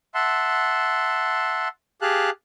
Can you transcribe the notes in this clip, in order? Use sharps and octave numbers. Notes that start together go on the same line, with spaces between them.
E5 F#5 A5 C6
G4 G#4 F5 A5 F#6